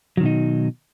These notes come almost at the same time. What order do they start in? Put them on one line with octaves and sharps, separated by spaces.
F#3 D#3 B2 D#4